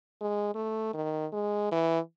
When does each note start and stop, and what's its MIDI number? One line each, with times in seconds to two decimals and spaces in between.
0.21 0.54 56
0.55 0.89 57
0.94 1.26 51
1.32 1.68 56
1.72 1.99 52